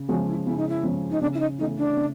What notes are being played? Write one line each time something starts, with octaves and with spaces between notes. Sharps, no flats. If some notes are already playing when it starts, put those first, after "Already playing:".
Already playing: C#3
F3 G#3 C#4 F#4
E4
C#3 E4
D#4
E4
F3 G#3 C#4
D#4
C#3 D4
E4
D#4
E3 A3 C#4 D#4
D4
C#3